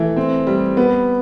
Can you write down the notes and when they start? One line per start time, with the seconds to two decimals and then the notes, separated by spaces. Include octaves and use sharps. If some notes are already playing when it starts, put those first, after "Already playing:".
Already playing: E3 A3
0.16 C4
0.47 G3
0.77 B3